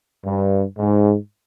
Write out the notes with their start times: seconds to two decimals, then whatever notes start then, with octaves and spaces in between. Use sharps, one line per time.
0.25 G2
0.78 G#2